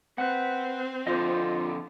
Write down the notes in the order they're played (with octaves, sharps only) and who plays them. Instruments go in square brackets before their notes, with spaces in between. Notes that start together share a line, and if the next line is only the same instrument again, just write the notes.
[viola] C4 [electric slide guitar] B4 F#5
[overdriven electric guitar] F2 D3 [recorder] F4 [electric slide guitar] C5 D#5